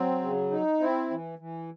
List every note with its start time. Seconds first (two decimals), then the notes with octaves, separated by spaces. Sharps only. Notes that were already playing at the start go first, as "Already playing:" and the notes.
Already playing: F#3 C4
0.22 C#3
0.51 D#4
0.80 C4 E4
1.10 E3
1.39 E3